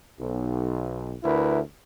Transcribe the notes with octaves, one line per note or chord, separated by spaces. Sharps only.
B1
D2 E4 A#4 B4